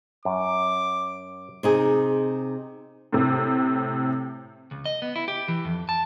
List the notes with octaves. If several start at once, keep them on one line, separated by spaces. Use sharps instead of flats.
F#2 D6
C3 D#4 G#4
A2 C3
C#2
D#5
B3
E4
G4
E3
F2
A5